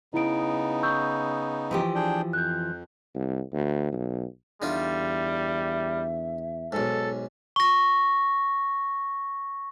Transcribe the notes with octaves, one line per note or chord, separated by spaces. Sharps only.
C#3 B3 D#4 E4 D7
C#6 E6 G6
E3 F3 G4
D4 G#4 G5
F2 F#6 G6
C2
D2
B1
E2 D3 G3 D#4 F4 E5
B1 G#2 A4
C#6 A#6